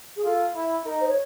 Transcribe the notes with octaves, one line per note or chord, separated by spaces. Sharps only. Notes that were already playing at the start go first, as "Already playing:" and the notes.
G#4
F4 A4
E4
D#4 A#4
C5
C#5